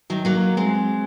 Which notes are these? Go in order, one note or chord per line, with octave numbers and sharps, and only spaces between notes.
D#3 F#3
F#3 A#3
G#3 C4